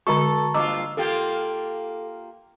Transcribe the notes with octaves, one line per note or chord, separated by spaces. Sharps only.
D3 G#3 F#4 A4 A#5 C#6
G2 A#3 F4 D#5 A#5 D6 E6
A#3 F4 G4 A4